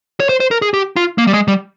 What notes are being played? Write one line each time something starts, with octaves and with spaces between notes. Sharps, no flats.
C#5
C5
C5
A#4
G#4
G4
F4
A#3
G3
G#3
G3